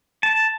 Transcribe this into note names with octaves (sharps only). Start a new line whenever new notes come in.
A5